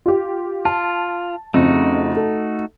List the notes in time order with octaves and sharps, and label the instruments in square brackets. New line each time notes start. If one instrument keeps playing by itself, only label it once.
[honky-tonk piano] F4 G4
[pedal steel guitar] F4 [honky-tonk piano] A5
[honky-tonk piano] F2 C#3 [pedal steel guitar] A3 D#4 F#4
[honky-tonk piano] A4